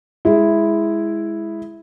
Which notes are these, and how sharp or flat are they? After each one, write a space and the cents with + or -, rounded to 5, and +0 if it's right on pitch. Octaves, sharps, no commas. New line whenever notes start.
G#3 +0 E4 +0